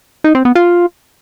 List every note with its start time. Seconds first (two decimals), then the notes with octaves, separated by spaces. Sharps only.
0.24 D#4
0.35 C4
0.45 B3
0.55 F4